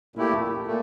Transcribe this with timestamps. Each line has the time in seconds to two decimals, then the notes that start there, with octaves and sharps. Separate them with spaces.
0.16 A#2 A3 E4 G4
0.66 A#2 A3